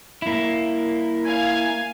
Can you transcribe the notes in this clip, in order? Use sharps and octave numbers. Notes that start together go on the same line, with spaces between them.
A#3 E4
F5 G#5 G#6